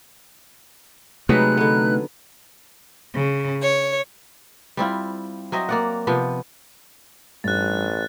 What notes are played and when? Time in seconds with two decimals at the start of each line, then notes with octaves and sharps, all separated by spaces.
1.29 C3 F#3 G#3 A3 D#4 B4 F#6
1.57 D3 B3
3.14 C#3
3.62 C#5
4.77 G3 C4 E4 F4
5.52 F#3 C4 D#5 E5
5.69 A#3 D5 F#5
6.07 C3 F3 B3
7.44 A1 G2 F#6 A6